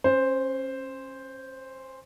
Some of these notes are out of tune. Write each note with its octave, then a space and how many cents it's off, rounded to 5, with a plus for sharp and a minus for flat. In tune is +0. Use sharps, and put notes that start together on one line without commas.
C#4 -30 C5 +0